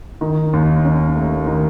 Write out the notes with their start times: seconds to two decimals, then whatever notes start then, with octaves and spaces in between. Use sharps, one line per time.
0.21 D#3
0.53 D#2
0.85 C#4
1.16 A3
1.47 D#3